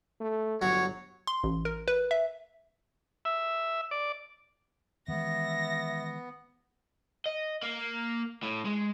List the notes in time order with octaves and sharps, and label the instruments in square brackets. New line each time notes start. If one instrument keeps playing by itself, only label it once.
[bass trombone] A3
[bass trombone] G1 [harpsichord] F#3 [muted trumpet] C#5
[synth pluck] C6
A1
A#4
B4
E5
[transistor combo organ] E5
D5
[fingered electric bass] D#3 E3 G#3 [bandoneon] B3 [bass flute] E5 [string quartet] A#6
[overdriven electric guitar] D#5
A#3
A2
G#3